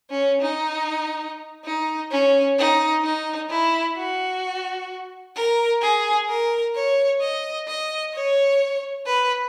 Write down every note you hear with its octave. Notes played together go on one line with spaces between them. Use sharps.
C#4
D#4
D#4
C#4
D#4
D#4
E4
F#4
A#4
G#4
A#4
C#5
D#5
D#5
C#5
B4